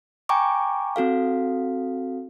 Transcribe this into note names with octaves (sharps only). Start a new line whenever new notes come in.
G5 G#5 A#5 C#6 D6
C4 F#4 A4 F5